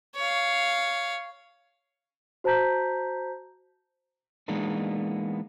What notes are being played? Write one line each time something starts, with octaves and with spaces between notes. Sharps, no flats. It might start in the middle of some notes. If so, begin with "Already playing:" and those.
C#5 F5
F#4 C5 A5 A#5 G6 B6
E3 G#3 A#3 B3 D4 D#4